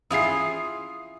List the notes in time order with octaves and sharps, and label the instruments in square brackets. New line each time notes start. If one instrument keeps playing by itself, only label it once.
[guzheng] E4 F4 G#4 [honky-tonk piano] D#6 C7